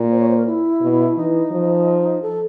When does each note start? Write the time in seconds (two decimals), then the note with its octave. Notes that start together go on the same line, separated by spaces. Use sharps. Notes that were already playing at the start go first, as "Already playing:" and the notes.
Already playing: A#2
0.11 C5
0.20 C#5
0.29 C5
0.37 A#4
0.46 E4
0.81 B2
1.17 E3 D#4
1.51 F3
2.22 A4